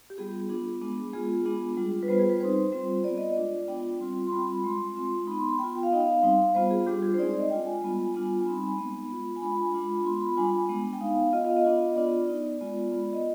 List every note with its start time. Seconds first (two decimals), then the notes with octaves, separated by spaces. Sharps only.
0.10 G4
0.18 G3 B3 F4 G#4
0.49 B3 D4 F4 G#4
0.81 G#3 B3 D4
1.13 G#3 B3 F4 G#4
1.45 G#3 B3 D4 F4
1.77 G3 D4 F4
2.03 B4
2.08 G3 B3 F4 C5
2.20 G#4
2.30 B4
2.40 G3 C4 D#4 C5
2.72 G3 C4 F4
3.04 B3 F4 D5
3.18 D#5
3.30 D5
3.36 G#3 D4 F4
3.68 B3 D4 F4 G5
4.00 G3 C4 F4
4.27 C6
4.32 G3 C4 F4 B5
4.47 B5
4.64 G#3 C4 F4 C6
4.95 G#3 C4 F4
5.27 B3 D#4 B5
5.38 C6
5.49 B5
5.59 B3 F4 G5
5.75 G5
5.83 F5
5.91 B3 D#4 D#5
6.01 F5
6.23 G3 C4 D#4
6.55 G3 B3 F4 C5
6.71 G#4
6.86 G3 D4 F4 G4
7.03 G#4
7.14 C5
7.18 G#3 C4 D#4 D5
7.29 D5
7.39 D#5
7.50 G#3 D4 F4 G5
7.66 G#5
7.82 G3 B3 F4
8.14 G3 B3 D4 F4
8.41 G#5
8.46 G3 C4 D#4 B5
8.78 G#3 B3 D#4
9.10 B3 F4
9.36 G#5
9.42 G#3 D4 F4 B5
9.74 G#3 D4 F4
10.05 B3 F4 C6
10.21 B5
10.37 G3 D4 F4 G#5
10.48 B5
10.59 G#5
10.69 G#3 B3 D4
10.93 G5
11.01 B3 D#4 F5
11.33 B3 F4 D#5
11.45 F5
11.56 D#5
11.65 B3 D4 F4
11.96 B3 D4 F4 D5
12.28 B3 D#4
12.61 G#3 B3 F4
12.92 B3 F4
13.13 D#5